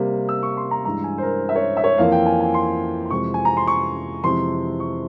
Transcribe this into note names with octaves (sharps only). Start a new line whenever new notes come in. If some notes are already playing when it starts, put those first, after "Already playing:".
Already playing: C3 G3 A#3
E6
C#6
C6
A#5
G2 E3 G#3 A#5
G#5
C5
A#4
E5
C#5
E5
C#5
F2 E3 A#3 F5
G5
G#5
G#5
C6
C6
F2 C3 E3 G#3 C#6
G#5
A#5
C6
C#6
F2 C3 E3 G#3 C4 C6
C#6